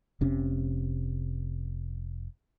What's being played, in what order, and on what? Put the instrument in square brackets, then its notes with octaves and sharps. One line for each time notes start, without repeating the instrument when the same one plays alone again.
[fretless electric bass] F1 C3 C#4